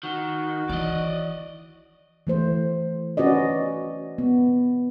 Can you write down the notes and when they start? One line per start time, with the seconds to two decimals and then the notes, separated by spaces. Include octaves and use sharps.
0.03 D#3 F#4
0.70 E3 D5 D#5
2.27 E3 A3 C5
3.17 C#4 F#4 B4 D5 D#5
4.18 B3